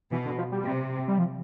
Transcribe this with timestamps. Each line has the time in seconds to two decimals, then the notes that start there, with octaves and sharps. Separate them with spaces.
0.12 B2 E3
0.26 D3
0.38 F3
0.52 G3
0.65 C3
1.08 G3
1.18 F3